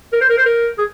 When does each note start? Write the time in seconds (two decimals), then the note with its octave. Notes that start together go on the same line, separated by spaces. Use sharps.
0.12 A#4
0.21 C5
0.30 A#4
0.38 C5
0.46 A#4
0.78 G#4